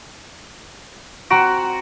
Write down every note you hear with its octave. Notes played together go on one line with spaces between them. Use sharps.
C4 F#4 A#5 D7